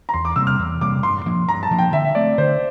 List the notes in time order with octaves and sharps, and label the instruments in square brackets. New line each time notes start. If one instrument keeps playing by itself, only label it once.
[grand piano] A#5
[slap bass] E2 [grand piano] C6
[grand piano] D6
[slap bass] C3 G3 A#3 [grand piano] E6
[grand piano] F6
[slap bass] E2
[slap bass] C3 G3 A#3 [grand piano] D6
[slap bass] G2 [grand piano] C6
[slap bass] F3 A#3 D4
[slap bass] G2 [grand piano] A#5
[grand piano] A5
[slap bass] F3 A#3 D4
[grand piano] G5
[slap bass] D3 [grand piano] E5
[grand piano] E5
[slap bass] A3 C4 [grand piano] D5
[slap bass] D3 [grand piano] C5